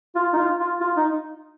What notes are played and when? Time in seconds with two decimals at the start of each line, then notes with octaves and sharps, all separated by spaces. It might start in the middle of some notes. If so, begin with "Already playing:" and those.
0.15 F4
0.33 D#4
0.37 F4
0.60 F4
0.81 F4
0.97 D#4